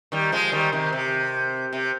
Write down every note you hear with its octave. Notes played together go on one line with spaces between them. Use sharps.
D#3 G3
F3 G#3
D#3 G3
C3 D#3
C3
C3